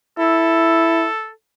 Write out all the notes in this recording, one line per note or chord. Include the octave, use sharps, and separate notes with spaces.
E4 A4